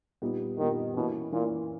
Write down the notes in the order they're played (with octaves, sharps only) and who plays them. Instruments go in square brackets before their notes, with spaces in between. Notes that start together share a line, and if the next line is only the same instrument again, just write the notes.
[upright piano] A#2 G3 B3 D#4
[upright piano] A#2 G3 B3 D#4 [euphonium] D#3
[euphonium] B2 [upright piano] E3 A#3 C#4 E4 A#4
[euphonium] A#2 [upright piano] E3 A#3 C#4 E4 A#4